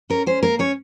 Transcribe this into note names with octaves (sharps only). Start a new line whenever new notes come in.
C#4 A#4
C#4 C5
A#3 A#4
C#4 C#5